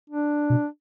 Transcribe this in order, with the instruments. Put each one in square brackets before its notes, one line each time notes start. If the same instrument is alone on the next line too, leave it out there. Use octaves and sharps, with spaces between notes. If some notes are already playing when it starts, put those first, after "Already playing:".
[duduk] D4
[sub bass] B2